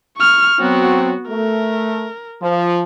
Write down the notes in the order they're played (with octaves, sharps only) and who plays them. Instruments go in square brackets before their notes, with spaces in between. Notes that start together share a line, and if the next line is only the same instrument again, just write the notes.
[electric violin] C#6 F6
[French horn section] F#3 C4 [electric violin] B3 F#4
[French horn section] A3 [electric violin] A#4
[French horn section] F3